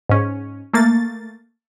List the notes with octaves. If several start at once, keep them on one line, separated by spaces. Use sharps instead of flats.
G#2 C#4
A3 A#3 A6